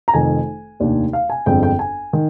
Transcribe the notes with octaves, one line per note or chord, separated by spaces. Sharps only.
A#5
F1 F2 D#3 G#5
F1 D#2 D#3 A#3 D4
F5
G#5
G1 F2 D3 G#3 C4 G5
G5
G#5
D#3